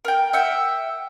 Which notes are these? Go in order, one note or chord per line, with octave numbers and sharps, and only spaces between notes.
A#4 G5
E5 F#5 G5